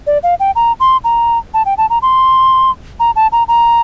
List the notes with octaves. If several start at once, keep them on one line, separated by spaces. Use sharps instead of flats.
D5
F5
G5
A#5
C6
A#5
A5
G5
A5
A#5
C6
A#5
A5
A#5
A#5